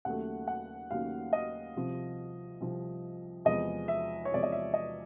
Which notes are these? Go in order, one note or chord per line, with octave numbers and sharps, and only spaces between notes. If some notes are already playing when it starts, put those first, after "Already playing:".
D#2 C#3 F#3 A3 F#5
F#5
D#2 C#3 F#3 A3 F5
D#5
C2 C3 F3
C2 C3 F3
E2 C3 F3 G#3 D#5
E5
C#5
E2 C3 F3 G#3 D5
D#5
E5
D#5